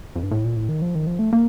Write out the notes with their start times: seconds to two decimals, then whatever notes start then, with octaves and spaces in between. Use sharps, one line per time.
0.16 F2
0.23 G2
0.31 A2
0.44 A#2
0.56 A2
0.69 D#3
0.82 F3
0.95 D#3
1.07 F3
1.19 A3
1.33 A#3